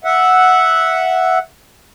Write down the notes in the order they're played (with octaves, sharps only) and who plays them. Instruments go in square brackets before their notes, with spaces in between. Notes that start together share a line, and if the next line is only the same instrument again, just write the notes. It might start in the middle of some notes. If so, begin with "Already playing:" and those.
[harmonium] E5 F#5